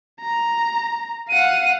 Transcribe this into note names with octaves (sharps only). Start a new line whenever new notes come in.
A#5
F5 F#5 D#7